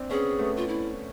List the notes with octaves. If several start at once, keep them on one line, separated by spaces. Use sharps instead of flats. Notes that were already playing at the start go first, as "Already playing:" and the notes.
Already playing: C4 D4
B3 C#4 G#4
A3 B3
F4
E4